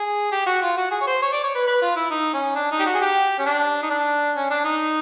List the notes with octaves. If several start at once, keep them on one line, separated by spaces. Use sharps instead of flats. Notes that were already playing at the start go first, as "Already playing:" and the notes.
Already playing: G#4
G4
F#4
F4
F#4
G#4
C#5
C5
C#5
D5
C#5
B4
B4
F4
E4
D#4
C#4
D4
D#4
G4
F#4
G#4
G4
C#4
D4
D#4
D4
C#4
D4
D#4